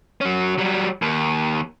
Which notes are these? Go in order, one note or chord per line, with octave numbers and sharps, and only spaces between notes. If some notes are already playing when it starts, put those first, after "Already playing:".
F#3 C#4
F#3 G3
D#2